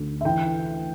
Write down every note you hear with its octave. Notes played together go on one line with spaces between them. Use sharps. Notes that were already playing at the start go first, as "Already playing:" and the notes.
Already playing: D2
E5
E3 G5